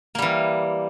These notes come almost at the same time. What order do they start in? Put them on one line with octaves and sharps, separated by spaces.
A#3 G3 E3